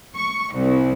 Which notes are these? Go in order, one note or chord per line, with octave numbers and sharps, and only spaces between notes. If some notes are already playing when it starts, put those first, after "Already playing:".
C#6
C2